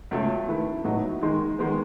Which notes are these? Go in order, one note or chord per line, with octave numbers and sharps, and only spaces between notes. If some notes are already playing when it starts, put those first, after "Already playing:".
C#2 B2 A3 C#4
D#3 A3 E4 B4
A2 F#3 B3 D#4 F#4
D#3 G#3 D#4
D#3 G#3 B3